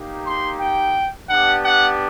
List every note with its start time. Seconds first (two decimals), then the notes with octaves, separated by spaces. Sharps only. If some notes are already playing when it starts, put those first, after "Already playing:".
Already playing: A#3 D#4 G4
0.26 C6
0.60 G5
1.29 B3 D4 G4 F#5
1.65 F#5